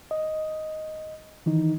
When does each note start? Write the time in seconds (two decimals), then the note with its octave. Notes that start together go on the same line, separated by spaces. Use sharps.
0.11 D#5
1.46 D#3 E3 D#4